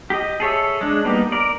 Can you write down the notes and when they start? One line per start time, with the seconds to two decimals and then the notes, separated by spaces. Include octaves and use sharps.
0.10 G4 D#5
0.40 G#4 A4 C#5 E5
0.81 G#3 D4
1.05 G3 A#3 B3 D#4 G4
1.32 A#4 D5